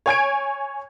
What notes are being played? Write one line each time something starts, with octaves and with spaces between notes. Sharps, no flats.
C#5 G#5 G#6 D7